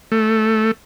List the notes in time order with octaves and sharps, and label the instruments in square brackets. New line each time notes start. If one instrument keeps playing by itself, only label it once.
[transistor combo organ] A3